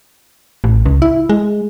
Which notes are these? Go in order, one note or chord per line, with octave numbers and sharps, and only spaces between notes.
A1
C#2
E4
G#3